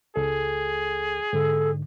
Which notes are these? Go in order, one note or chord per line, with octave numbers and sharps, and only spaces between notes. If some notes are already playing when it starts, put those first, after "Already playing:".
C#2 G#4 A4
G#2 D3 A4